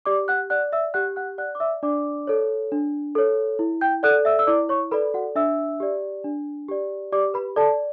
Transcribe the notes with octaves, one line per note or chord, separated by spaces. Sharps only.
G4 D5 D6
F#5 F#6
D5 F#5 F#6
E5 E6
G4 F#5 F#6
F#5 F#6
D5 F#5 F#6
D6
E5 E6
D4 D5 D6
A4 C#5
D4
A4 C#5
E4
G5 G6
A4 D5 F#5 F#6
E5 E6
E6
E4 D5 D6
C#5 C#6
A4 B4 D5 B5
F#4 F#5
D4 E5 E6
G4 D5
D4
G4 D5
G4 D5 D6
B4 B5
A4 D5 A5